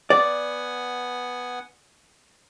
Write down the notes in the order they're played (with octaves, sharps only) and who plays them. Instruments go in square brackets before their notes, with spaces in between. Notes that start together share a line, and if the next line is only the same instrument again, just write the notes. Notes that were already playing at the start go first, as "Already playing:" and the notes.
[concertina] B3 F#5 G#5 [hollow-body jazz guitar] D5